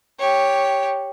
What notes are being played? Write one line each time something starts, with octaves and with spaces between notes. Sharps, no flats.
G4 C#5